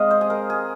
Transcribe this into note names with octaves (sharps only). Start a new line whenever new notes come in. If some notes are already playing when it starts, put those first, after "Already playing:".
Already playing: G#3 C4 D#5 F5
C5
G#4
A#4
G#4